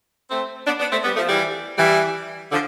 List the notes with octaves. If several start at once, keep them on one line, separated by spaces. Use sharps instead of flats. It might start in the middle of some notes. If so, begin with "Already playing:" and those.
A3 C4
B3 D4
B3 D4
A3 C4
G3 B3
F3 A3
E3 G3
E3 G3
D3 F3